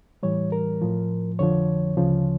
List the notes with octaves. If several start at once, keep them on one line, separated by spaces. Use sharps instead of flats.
A2 E3 G3 C#5
A#4
A2 F3
F2 D3 F3 C#5
D2 C#3 F3